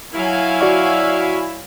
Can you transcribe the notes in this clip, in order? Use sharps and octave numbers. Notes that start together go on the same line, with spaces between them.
F#3 E4 F5 G#5
F#4 D5 C#6